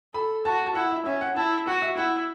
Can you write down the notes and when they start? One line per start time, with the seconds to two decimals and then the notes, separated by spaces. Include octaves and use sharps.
0.14 A4 B5
0.45 F#4 A5
0.66 A5
0.75 E4 F#5
0.91 E5
1.06 C#4 E5
1.21 F#5
1.36 E4 A5
1.67 F#4 F#5
1.82 E5
1.97 E4 F#5